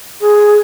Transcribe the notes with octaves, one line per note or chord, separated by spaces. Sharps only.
G#4